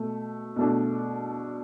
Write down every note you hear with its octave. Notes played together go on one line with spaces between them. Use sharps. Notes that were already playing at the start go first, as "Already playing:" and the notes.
Already playing: B2 A3
B2 A3 D4